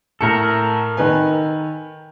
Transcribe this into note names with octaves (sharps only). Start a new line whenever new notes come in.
A2 A4 A#4 C#7
D#3 B4 G#5